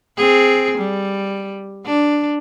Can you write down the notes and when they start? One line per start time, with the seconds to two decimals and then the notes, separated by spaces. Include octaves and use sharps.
0.17 C4 G#4
0.77 G3
1.86 D4